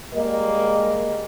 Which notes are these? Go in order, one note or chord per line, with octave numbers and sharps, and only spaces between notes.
G3 G#3 A#3 A#4 D#5